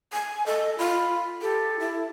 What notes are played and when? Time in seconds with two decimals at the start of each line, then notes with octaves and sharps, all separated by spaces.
0.13 G#5
0.46 A4 D#5
0.78 F4 B5
1.42 G4 A4
1.80 E4